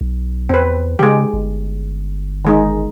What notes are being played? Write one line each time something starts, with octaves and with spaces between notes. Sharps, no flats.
B1
E2 C4 B4
C#3 G#3 G4
G1
D#3 G#3 D#4